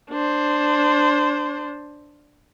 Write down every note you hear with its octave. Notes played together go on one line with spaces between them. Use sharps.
D4 C5